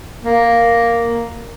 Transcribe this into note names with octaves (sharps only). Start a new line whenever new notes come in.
A#3